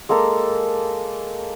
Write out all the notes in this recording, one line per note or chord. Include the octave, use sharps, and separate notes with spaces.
G#3 A#3 A4 A#5